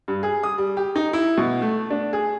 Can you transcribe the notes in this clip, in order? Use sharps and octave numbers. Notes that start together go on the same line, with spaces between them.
G2
G#4
D#6
G3
G4
D#4
E4
B2
A3
D4
G#4